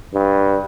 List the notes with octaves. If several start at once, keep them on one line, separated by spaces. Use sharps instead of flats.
G2